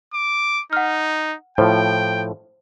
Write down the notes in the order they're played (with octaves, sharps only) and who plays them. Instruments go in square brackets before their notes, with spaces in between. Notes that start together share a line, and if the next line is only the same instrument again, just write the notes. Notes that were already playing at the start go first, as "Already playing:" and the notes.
[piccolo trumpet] D6
[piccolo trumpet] D#4 [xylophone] F#5 F6
[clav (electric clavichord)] A2 F3 [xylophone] C5 [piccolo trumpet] G5